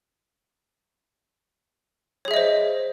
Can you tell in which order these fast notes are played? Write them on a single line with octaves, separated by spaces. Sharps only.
C#5 G#4 E5 D#5 C5